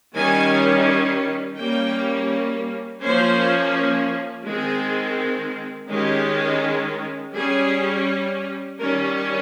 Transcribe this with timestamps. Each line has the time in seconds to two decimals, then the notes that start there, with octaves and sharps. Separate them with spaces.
0.15 D#3 G3 C#4 G#5
1.59 G3 A#3 C#4 G5
3.03 F3 A#3 C#4 C5
4.47 D#3 G#3 C4 G#4
5.91 D#3 G#3 C#4 G4
7.35 G3 C#4 G#4
8.79 D#3 G3 C#4 A#4